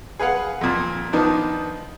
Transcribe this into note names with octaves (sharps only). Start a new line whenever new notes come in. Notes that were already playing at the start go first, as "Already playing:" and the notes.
G#4 B4 F5 F#5
F2 A#2
D#3 F3 B3 D4 D#4